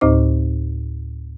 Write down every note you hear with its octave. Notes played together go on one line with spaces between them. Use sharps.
D2 A2 C4 D#4 C5 D6